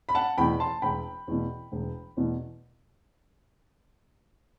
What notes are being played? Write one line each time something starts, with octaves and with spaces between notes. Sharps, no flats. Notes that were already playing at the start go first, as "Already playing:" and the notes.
B5
F#5 A5
E2 B2 G5 B5
A5 C6
E1 G5 B5
E2 B2
E1
E2 B2